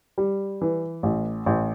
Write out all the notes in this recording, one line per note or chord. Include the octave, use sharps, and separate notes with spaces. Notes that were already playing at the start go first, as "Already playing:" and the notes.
G3
E3
A1
A1